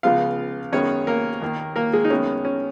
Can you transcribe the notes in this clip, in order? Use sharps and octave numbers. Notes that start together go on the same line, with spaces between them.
C#2 C#3 F3 G#3 B3 F4 F5
F#2 D#3 G#3 B3 C#4 C#5
A#3 A#4
D#2 D#3 A#3
A#3 A#4
G#3 G#4
D#4
F#2 D#3 G#3 B3 C#4
C#4